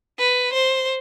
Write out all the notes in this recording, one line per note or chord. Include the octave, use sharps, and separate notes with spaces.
B4
C5